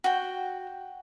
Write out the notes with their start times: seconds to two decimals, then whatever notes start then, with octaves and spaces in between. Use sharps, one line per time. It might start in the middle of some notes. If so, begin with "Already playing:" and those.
0.04 F#4 G5